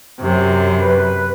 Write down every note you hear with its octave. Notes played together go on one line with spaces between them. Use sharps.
F#2 C3
B4